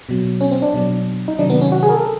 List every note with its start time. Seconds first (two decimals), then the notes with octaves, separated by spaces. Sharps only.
0.09 B2 F#3
0.41 C#4
0.51 C4
0.62 D4
0.74 B2 F#3
1.28 D#4
1.39 C3 D#3 F#3 D4
1.50 B3
1.61 C#4
1.72 F#4
1.83 G#4
1.89 A#4
1.93 A4